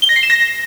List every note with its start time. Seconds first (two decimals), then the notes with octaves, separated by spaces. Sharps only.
0.02 G7
0.09 A#6
0.16 C7
0.23 E7
0.30 A#6